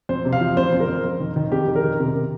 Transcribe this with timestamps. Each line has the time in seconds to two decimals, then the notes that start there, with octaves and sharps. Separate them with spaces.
0.09 F2 C5
0.25 C3
0.33 F5
0.41 F3
0.57 F2 C5
0.73 F2
0.80 A#4
0.88 F2
1.04 F2
1.20 D#3
1.36 D#3
1.52 F2 G4
1.68 D#3
1.75 A#4
1.84 D#3
1.99 C3
2.15 C3